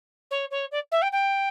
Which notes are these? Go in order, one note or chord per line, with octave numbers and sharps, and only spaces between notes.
C#5
C#5
D5
E5
G5
G5